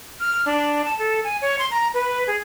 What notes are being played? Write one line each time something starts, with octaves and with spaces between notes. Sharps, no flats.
F6
D4
A5
A4
G#5
C#5
C6
A#5
B4
G#4